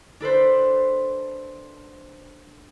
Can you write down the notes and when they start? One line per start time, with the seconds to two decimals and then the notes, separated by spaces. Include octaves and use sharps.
0.20 D4 A4 B4 C5